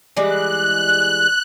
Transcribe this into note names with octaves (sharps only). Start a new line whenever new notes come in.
E3 G3 G#3 F#6